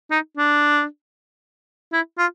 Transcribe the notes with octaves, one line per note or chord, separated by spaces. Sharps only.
D#4
D4
E4
F4